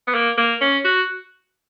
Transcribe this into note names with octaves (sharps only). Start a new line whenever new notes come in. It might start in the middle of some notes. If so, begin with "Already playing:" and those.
B3
A#3
A#3
C#4
F#4